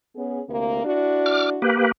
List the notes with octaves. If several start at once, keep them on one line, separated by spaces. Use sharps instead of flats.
B3 C#4 G#4
D2 C3 A#3
D4 E4 F#4
D6 F6
A#3 G4 B4